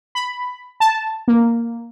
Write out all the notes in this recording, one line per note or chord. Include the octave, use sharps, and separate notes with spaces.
B5
A5
A#3